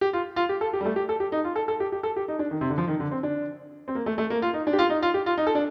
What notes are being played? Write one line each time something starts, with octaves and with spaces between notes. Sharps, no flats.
G4
F4
F4
G4
A4
G4
G3
A3
G4
A4
G4
D#4
F4
A4
A4
G4
G4
A4
G4
D#4
D4
D#3
C3
D3
F3
D#3
D3
C4
D4
C4
A#3
A3
A3
A#3
F4
D#4
D4
G4
F4
D#4
F4
G4
F4
D#4
A4
D4